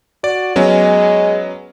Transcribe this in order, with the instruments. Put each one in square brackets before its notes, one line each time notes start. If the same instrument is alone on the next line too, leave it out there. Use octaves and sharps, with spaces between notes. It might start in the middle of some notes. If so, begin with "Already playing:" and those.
[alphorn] F#4 [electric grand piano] D5
[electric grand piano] F#3 B3 C#4 [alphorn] G#3